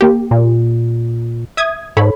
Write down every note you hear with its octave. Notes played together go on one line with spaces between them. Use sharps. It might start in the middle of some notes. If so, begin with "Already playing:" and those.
A#3 G4
A#2
E5 D#6 G#6
G#2 A4 C#5 B5